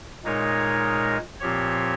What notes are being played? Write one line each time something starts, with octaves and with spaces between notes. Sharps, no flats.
A#2 G#3 D#4 A#4 C#5
A#2 F3 C4 G4 C#5